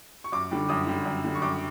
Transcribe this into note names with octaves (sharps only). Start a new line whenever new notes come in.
C#6
F#2 D6
D3 G3
F#2 D#6
D3 G3
F#2
D3 G3
C#6
F#2 D6